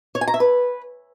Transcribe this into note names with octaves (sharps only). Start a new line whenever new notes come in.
C#5
G#5
A#5
E5
B4